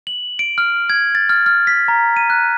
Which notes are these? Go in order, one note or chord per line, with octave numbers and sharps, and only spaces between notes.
F#7
D7
F6
G#6
A6
F6
F6
B6
A#5
D#7
F#6